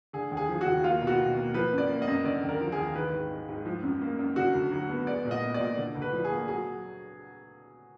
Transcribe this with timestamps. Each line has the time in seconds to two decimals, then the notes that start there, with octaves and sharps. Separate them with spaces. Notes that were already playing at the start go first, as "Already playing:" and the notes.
0.13 D3 G#4
0.32 D#2
0.37 G#4
0.49 F3
0.61 F#4
0.66 D#2
0.84 A#3 F4
1.02 B2
1.07 F#4
1.19 B2
1.37 A#3
1.54 F3 B4
1.73 F#2
1.78 D5
1.89 A#3
2.02 D#5
2.08 F#2
2.25 D3 D5
2.43 D#2
2.49 A#4
2.61 F3
2.72 G#4
2.78 D#2
2.95 D#3 B4
3.13 G#2
3.31 G#3
3.49 G#2
3.66 F3
3.83 F#2
4.01 A#3
4.19 F#2
4.36 D3 F#4
4.54 D2
4.72 F#3
4.89 B3
5.07 G#3 D5
5.25 A#2
5.31 D#5
5.43 B3
5.54 D5
5.60 A#2
5.77 D3
5.95 D2
6.02 B4
6.13 F3
6.24 G#4
6.31 A#3
6.48 F#3 G#4